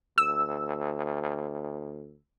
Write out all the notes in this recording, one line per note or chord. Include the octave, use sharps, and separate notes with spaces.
D2 E6